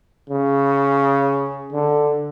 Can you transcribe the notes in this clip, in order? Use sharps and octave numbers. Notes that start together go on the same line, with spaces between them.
C#3
D3